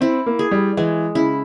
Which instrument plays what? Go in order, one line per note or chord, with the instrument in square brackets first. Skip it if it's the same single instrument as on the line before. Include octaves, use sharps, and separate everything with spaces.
[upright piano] C4 [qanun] E4
[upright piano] A#3
[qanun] G#4
[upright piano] G3
[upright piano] E3 [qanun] G#3
[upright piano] C#3 [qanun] E4